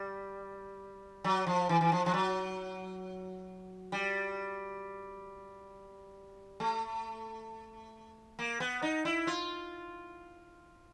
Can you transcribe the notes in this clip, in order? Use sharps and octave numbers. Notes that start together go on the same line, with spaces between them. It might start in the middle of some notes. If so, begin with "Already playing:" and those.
Already playing: G3
F#3
F3
E3
E3
F3
F3
F#3
G3
A3
A#3
B3
D#4
E4
F4